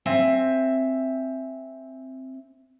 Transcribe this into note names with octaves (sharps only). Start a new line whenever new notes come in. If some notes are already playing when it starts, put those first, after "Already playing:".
C4 E5 G#5